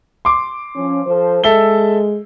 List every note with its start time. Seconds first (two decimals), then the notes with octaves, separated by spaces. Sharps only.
0.25 C6 D6
0.76 F3 C#4
1.06 F3 A4 C5
1.44 G#3 A4 E5 G7